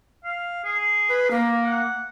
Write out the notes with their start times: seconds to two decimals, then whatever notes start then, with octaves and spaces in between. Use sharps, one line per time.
0.24 F5
0.64 G#4
1.09 B4
1.31 A#3
1.63 F#5